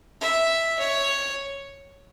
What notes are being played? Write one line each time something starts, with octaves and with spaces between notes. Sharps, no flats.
E5
C#5